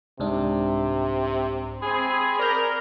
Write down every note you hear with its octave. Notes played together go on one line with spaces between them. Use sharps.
C2 G#2 C3 D4
C4 G#4 B5
A#4 D5 G6